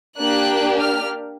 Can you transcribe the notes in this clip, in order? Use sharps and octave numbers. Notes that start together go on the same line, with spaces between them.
A#3 D4 G4 F#6
F6